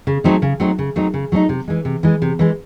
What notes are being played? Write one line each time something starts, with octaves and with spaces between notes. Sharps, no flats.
C#3
F#3 A3 C4 D#4
C#3
F#3 A3 C4 D#4
C#3
F#3 A3 C4 D#4
C#3
F#3 A3 C4 D#4
C3
E3 G#3
C3
E3 G#3
C3
E3 G#3